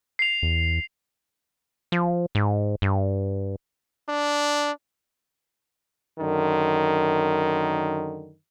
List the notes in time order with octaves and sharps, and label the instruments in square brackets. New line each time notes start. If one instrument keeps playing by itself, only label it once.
[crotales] C7 F7
[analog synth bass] E2
[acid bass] F3
G#2
G2
[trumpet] D4
[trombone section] F#2 D3 D#3